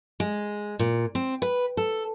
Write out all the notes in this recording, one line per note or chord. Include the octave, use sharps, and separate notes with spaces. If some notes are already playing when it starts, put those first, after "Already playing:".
G#3
A#2
C4
B4
A4